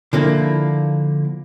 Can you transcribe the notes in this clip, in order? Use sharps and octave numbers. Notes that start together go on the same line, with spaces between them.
D3 F3 A#3 E4